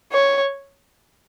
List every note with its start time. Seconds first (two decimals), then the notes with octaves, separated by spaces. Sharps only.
0.13 C#5